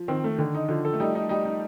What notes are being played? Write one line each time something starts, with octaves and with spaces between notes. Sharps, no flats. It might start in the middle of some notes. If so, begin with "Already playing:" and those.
Already playing: F3
D#3 C4
A3
D3 D#3
D#4
D3 F3
A4
A3
G3 D#4
D#4
G3 D#4
D#4